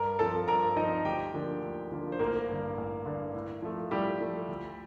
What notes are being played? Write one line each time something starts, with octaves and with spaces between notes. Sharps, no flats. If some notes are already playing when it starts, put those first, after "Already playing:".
Already playing: G2 A#4 A#5
F3 C4 A4 A5
G2 A#4 A#5
F3 C4 D#4 D#5
D2 G4 G5
D3 F3 A#3 D4
D2
D3 F3 A#3 D4
C5
A1 A#3 A#4
G2 D3
A1
G2 D3
A2
F3 A3
A2 G3 G4
F3 A3
D2